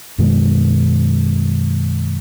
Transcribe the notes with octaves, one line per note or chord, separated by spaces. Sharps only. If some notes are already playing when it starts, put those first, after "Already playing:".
F#2 B2 D#3 G#3